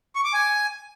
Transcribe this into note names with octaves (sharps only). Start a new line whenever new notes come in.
C#6
D6
G#5